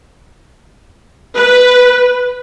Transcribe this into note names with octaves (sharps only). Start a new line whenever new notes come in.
B4